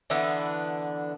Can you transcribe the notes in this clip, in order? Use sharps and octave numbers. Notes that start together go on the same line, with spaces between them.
D3 E3 B3 D4